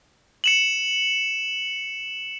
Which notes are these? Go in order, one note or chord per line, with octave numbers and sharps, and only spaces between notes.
C#7 E7 F#7